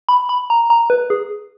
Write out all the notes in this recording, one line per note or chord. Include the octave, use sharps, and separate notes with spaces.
B5
B5
A#5
A#5
B4
G#4